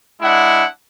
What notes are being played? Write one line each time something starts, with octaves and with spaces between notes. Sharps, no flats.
G#3 D4 E4 F#5